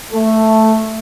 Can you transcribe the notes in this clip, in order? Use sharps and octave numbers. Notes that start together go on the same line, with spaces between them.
A3